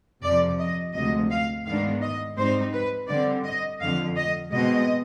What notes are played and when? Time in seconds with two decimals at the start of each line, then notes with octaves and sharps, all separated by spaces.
0.23 F2 C3 F3 D5
0.59 D#5
0.95 D2 C3 F3 G#3 D#5
1.30 F5
1.66 G#2 D#3 G#3 B3 D4 F5
2.02 D#5
2.37 G#2 G3 C4 D#4 C5
2.74 B4
3.09 D3 G3 C4 D5
3.45 D#5
3.81 F2 D3 F3 F5
4.17 D#5
4.52 B2 G#3 C4 D#5